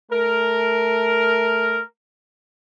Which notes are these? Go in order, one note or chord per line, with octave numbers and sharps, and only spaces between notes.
A3 A#4